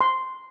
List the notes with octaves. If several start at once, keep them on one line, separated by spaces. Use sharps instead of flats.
C6